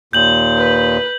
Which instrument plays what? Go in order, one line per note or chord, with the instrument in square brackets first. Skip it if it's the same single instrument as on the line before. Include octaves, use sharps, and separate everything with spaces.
[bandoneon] D#2 A#2 [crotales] G6 F#7
[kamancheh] B4